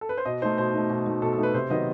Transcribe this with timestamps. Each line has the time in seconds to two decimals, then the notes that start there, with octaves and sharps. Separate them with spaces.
0.01 A4
0.09 B4
0.18 C5
0.25 B2 D#5
0.42 A3 D#4 C5
0.58 B2 C5
0.74 A3 D#4
0.90 B2
1.06 A3 D#4
1.22 B2 A4
1.33 A4
1.38 A3 D#4 B4
1.54 C3 C5
1.70 D#3 F#3 B3 D#5